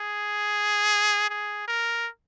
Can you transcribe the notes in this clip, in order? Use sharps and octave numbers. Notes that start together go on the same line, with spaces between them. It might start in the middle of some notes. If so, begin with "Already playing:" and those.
Already playing: G#4
G#4
A#4